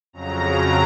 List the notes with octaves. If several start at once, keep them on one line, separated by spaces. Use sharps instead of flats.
F2 C#3 F#3 A#5